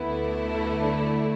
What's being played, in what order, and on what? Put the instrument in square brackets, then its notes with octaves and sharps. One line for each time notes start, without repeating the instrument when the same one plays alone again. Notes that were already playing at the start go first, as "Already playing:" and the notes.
Already playing: [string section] D2 D3 A3 E4 [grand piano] B3 B4
[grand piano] A4
B4
D4 D5